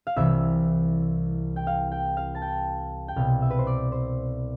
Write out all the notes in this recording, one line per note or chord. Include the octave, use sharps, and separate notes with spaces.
F5
C2 C3 E3 E5
G5
F5
G5
F5
A5
G5
G5
C2 B2 F5
E5
B4
C5
D5
C5